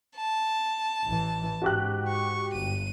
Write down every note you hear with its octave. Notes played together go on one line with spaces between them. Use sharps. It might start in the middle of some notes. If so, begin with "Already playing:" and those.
A5
A1 E3
G#2 F#4 G4 F#6
C#6
G1 D#7